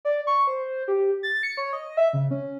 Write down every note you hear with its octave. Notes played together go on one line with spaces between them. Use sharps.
D5
C#6
C5
G4
A6
C#7
C#5
D#5
E5
C#3
C#4